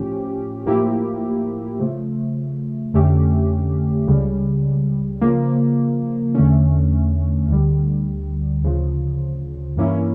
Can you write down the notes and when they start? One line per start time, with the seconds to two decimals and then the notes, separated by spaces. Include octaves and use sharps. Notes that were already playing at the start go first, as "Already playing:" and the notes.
Already playing: A2 F3 C#4 G4
0.66 A2 F3 A#3 E4 G4
1.80 C#3 F3 A3
2.93 F2 D3 A3 C#4 G4
4.08 C#2 C#3 G3
5.21 C#3 F3 A#3
6.35 E2 D3 A3 C#4
7.48 D2 D3 G3
8.63 D2 C#3 F3
9.76 G2 E3 A#3 C#4 E4